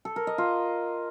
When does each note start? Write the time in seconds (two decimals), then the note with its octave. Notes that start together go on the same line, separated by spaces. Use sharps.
0.05 A4
0.16 A#4
0.27 D#5
0.38 F4